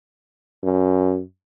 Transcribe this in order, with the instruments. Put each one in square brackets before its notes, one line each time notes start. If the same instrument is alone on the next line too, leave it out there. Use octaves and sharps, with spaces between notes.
[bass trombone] F#2